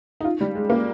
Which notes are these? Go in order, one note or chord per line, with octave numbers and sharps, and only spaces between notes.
D#4
F4
G3
G#3
A#3